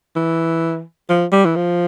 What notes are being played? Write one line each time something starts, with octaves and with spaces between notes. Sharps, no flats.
E3
F3
G3
E3
F3